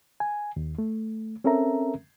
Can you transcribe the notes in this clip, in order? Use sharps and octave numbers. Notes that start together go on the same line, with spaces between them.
G#5
D#2
A3
C4 C#4 A4 A#4 E5 A#5